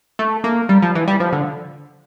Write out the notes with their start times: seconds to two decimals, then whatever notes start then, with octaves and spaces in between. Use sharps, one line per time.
0.19 A3
0.44 A#3
0.69 G3
0.82 F3
0.95 E3
1.08 G3
1.20 F3
1.33 D3